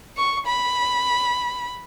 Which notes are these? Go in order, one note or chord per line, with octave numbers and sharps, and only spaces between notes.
C#6
B5